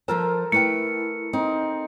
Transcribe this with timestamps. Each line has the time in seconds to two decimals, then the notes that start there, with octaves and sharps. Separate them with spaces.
0.08 F3 F4 A4 A#4 C5 A5
0.52 A3 E4 B4 G5 C#7
1.33 C4 D#4